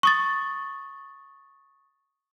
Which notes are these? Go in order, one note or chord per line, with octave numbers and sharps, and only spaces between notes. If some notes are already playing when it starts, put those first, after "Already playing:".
C#6 D#6 A6